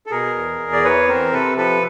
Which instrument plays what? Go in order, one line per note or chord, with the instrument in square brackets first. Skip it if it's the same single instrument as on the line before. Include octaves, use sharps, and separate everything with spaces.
[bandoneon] A4
B2 G#4 A#4
E2
E2
D5
E3 B4 C#5
C4 A#4 C5
C3 A4 B4
F3 A4 B4